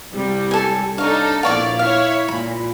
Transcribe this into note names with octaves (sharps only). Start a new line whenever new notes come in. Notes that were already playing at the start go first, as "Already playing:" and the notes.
C2 G3
A4 G#5
D4 D#4 A4 C#5 F5
A#1 E4 C#5 D5 F5
E4 C#5 F5
A#2 B5